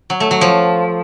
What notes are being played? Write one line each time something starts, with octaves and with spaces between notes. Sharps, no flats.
F#3
A3
F#3
F3